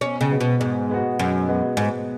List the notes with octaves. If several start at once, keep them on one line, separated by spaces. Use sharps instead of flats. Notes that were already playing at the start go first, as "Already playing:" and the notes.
B2 C#4
C#3
G#3 B3 F#4
B2
G#2 B2
G#3 B3 F#4
F#2 B2
G#3 B3 F#4
G#2 B2